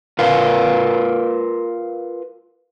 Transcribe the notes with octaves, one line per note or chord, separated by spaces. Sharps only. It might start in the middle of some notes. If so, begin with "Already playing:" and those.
F4 A#4 B4 F5